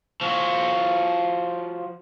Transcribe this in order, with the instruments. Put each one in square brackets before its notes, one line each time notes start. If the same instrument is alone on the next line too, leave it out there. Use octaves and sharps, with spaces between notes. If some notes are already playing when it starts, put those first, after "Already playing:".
[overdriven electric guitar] F3 F#4